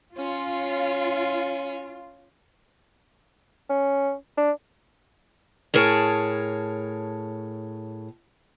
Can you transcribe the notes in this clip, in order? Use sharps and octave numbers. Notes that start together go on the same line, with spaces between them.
C#4 F4 C#5
C#4
D4
A2 G#4 A#4 C#5 A5